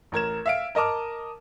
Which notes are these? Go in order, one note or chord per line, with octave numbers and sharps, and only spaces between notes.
A1 A#4 G#6 E7
E5 F5 D7
A#4 D#5 A5 D6 F6